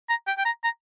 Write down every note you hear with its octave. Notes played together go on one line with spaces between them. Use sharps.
A#5
G5
G5
A#5
A#5